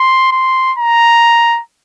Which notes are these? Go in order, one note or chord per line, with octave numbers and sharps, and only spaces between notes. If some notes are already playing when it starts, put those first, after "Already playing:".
Already playing: C6
C6
A#5